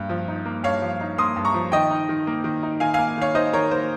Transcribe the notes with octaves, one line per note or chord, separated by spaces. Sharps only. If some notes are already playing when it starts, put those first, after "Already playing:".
Already playing: G2 A#3
F3
D#4
A#3
G2 C#5 F5
F3
D#4
A#3 C6 D#6
G2
A#5 C#6
F3
D#3 D#5 G5
D#4
D#3
A#3
D#3
D#4
D#3 F5 G#5
A#3 F5 G#5
D#3 C#5 F5
D#4 C5 D#5
D#3 A#4 C#5
A#3 C5